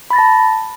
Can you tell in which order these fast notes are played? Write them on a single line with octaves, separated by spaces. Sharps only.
B5 A6 A#6 A5